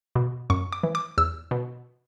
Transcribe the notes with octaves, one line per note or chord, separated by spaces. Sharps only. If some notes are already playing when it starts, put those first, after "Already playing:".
B2
F#2 C#6
D6
E3
D6
E2 E6
B2